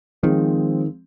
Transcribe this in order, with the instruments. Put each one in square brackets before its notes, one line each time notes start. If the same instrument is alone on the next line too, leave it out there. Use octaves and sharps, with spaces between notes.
[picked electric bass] D#3 [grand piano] F3 G#3 C4